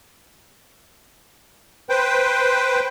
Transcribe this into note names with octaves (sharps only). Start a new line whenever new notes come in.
B4 C5 G5